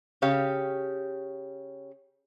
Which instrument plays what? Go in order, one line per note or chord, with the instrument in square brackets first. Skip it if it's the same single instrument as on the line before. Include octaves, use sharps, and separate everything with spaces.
[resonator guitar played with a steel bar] C#3 G4 C#5 F5